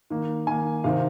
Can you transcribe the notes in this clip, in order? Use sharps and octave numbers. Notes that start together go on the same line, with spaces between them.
D#3 A#3
D#3 A#3 G#5
C3 D#3 C4 F5